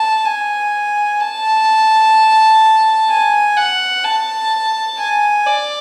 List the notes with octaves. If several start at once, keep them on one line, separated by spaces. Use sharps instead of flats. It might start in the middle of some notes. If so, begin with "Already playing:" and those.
Already playing: A5
G#5
A5
G#5
F#5
A5
G#5
D5